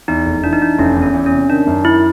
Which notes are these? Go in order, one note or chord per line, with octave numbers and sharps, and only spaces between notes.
E2 D#4
F1
E3 D4
D#4
E3 D4
F1 C#4
E2
C#4
E2
C#4
C3
D#3 D4
F#2
D#3 E4